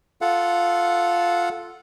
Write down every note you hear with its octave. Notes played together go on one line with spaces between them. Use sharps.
F4 A4 F5 F#5